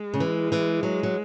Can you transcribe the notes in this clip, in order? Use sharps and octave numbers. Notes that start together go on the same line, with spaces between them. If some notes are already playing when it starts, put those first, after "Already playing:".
Already playing: G#3
C#3
E3
E3
F#3
F#3